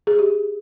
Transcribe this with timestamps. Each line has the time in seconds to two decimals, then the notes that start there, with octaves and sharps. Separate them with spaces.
0.07 G#4
0.19 G4